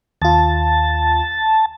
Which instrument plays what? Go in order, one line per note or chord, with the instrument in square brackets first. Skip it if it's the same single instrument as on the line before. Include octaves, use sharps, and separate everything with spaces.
[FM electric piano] D#2 F4 [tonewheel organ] A5